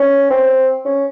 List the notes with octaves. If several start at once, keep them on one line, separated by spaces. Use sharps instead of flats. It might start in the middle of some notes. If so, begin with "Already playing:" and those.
Already playing: C#4
C4
C#4